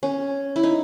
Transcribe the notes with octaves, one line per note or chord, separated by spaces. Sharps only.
C#4
E4
D#4